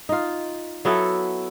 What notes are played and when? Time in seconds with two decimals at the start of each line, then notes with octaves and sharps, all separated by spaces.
0.09 D#4 F4
0.85 F#3 B3 E4 A4